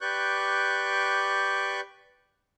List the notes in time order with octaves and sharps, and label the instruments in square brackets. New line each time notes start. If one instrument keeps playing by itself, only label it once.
[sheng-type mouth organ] G4 B4 D5 C#6 F#6 G6